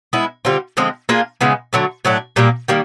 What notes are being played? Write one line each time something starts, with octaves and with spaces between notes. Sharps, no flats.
G#3 B3 E4
D3 G3 C4 F4
D3 F3 G#3 C4
A#3 D4 F4 G#4
C#3 E3 G#3 B3
D3 F#3 A3
A2 F#3 A3 D4
A#2 G3 A#3
D#3 G3 A#3